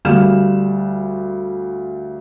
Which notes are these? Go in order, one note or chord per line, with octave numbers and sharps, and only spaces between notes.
D2 G3 F5 F6 E7